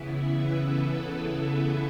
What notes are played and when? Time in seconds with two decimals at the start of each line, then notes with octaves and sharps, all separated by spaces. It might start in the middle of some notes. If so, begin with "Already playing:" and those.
Already playing: C#3 E3 B3 E4
0.09 E5
0.38 B4
0.67 A4